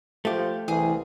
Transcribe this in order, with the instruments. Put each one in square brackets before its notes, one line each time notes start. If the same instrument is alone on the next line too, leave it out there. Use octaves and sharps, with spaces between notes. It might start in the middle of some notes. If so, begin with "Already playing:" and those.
[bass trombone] F3 [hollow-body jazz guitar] A3 G4
[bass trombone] C2 [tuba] E3 [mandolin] G#4